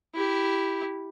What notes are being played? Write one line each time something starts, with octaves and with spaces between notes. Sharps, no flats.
E4 G4